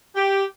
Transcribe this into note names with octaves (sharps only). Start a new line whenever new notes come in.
G4